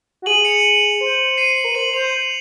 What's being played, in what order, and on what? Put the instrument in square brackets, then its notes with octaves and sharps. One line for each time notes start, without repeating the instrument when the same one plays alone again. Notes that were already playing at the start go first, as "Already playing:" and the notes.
[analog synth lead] F#4
[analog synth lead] G#4 [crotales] D#7 F#7
[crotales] C#7 F7
[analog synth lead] C5
[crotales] C7 D#7
[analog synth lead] A#4
[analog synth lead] C5 [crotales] D#7 F#7
[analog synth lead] C5 [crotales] F7